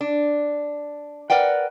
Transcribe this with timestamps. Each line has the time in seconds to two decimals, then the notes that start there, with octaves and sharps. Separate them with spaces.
0.01 D4
1.30 A#4 B4 D5 F#5 G5